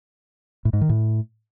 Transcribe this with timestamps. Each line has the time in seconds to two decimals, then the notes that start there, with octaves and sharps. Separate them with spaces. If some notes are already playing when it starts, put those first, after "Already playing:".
0.65 A2
0.73 G#2
0.81 D#3
0.89 A2